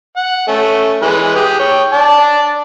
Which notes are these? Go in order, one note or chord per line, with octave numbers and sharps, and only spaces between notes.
F#5
A3 C#4
E3 G#3 B4
G4 G#4
C#5 G5
D5 A5